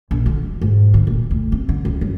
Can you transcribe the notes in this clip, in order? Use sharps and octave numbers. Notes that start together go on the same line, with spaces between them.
A#1
D3
F2
G#2
D3
A#2
D2
C4
D3
C#2
F#2